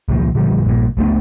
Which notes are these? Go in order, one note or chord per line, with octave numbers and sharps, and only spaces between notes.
C#2 A#2 D#3 F3
A#2 D3 F3 G3
A#1 G2 A#2
C#2 A3 B3 D4